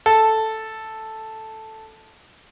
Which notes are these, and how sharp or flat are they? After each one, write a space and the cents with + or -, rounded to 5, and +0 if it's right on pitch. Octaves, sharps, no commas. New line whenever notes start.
A4 +0